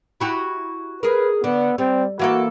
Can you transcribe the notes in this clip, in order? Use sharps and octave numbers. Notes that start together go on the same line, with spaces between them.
E4 F#4 G4
G#4 A#4 B4
D3 B3
G3 C4
E3 A#3 F#4 A4